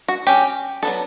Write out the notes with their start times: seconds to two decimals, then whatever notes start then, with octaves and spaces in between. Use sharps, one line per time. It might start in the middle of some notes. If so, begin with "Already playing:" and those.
0.08 F#4
0.27 F#3 C#4 G4
0.82 F#3 B3 D4 A4